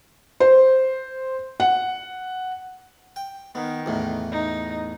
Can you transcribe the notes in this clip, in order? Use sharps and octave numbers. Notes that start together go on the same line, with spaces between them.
C5
F#5
G5
D#3 B3
E2 A2
D#4